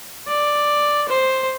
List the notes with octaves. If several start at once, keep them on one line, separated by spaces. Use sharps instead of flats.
D5
C5